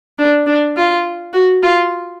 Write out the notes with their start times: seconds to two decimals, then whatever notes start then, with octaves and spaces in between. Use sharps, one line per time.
0.18 D4
0.46 D4
0.76 F4
1.33 F#4
1.63 F4